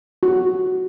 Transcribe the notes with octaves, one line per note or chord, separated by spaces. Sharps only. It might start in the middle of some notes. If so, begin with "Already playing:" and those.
F#4